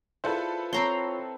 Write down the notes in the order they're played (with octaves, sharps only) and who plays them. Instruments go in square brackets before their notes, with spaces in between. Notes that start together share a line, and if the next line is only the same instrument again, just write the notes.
[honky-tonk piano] E4 A4 B4 [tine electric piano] F4 C5 [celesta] G#4 D5 E5
[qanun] C4 A#5 C6 [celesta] C#5 C#6 F7